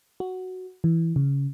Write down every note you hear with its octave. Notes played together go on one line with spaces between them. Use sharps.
F#4
E3
C#3